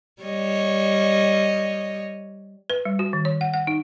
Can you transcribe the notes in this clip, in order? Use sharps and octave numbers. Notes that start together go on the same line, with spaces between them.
G3 C#5 D#5
B4
G3
F#4
D#3
C#5
F#5
F#5
D#4